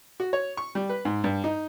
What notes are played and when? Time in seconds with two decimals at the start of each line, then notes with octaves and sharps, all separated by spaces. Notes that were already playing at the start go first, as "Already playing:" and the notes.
0.20 F#4
0.33 C#5
0.57 C#6
0.75 G3
0.89 B4
1.05 G#2
1.24 G2
1.44 D#4